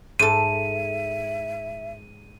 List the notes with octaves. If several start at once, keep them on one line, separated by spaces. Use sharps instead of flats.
G#2 A4 E5 D#7